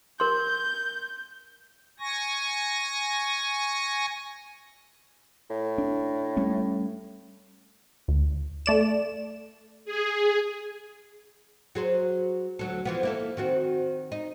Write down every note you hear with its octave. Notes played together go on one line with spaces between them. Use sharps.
A#4 C6 G6
G#5 C#6 A#6
A2
D4
G3 A3 C#4
D2
A3 D5 E7
G#4
F#3 G#4 C5
D2 F#3 A4
E3 F3 B3
A#3 E4 A4
D#3 C4 F#4
D#4